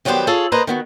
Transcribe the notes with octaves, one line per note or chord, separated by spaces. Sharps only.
D#3 F#3 G3 B3 G4 C5
F4 G#4 A4 C#5
A#3 B4 C5 D#5 A#5
D#3 B3 F#4